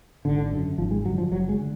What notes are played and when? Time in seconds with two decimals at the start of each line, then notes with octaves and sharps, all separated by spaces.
0.25 G#1 D3
0.51 F#2 D3
0.78 G#1 F3
0.91 G#3
1.05 F#2 D3 F#3
1.18 F3
1.31 F#1 F#3
1.49 G#3
1.59 D3